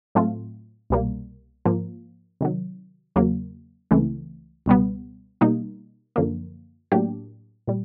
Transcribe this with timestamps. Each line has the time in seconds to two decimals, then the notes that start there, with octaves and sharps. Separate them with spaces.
0.15 A2 F#3 A3 C4 F4
0.90 C2 B2 G3 A#3
1.65 G#2 F3 A#3
2.41 C3 D#3 F#3
3.16 E2 C#3 F#3 A#3
3.91 C#2 C#3 E3 A3 C4
4.66 C#2 B2 G3 B3
5.41 B2 G3 A#3 D#4
6.16 F#2 D3 F3 A#3
6.92 A2 F#3 A#3 D4 G4
7.67 A#2 G3